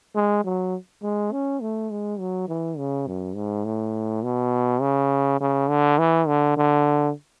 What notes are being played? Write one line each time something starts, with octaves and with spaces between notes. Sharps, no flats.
G#3
F#3
G#3
C#4
A3
G#3
F#3
E3
C#3
F#2
G#2
A2
B2
C#3
C#3
D3
E3
D3
D3